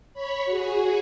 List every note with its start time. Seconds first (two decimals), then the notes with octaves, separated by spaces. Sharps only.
0.14 C#5 B5
0.46 F#4 G#4